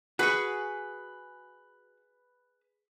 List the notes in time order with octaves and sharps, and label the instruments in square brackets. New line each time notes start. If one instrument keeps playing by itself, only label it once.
[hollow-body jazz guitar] F#4 [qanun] G#4 B5 C#6 [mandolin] B4